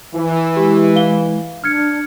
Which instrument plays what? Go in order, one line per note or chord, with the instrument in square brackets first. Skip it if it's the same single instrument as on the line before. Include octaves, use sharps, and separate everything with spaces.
[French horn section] E3
[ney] G#3 [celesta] G4
[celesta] F5 G7
[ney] D4 [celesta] F6 G#6 C#7